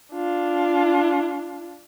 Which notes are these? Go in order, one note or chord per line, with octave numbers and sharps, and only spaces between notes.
D4 F4